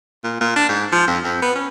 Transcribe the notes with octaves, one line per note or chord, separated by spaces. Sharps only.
A#2
A#2
D4
G#2
F3
F2
F2
B3
C#4